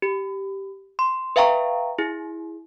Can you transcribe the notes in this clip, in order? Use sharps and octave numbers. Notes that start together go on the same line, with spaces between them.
G4
C6
B4 E5 F5 G5 A#5 C#6
E4 G#4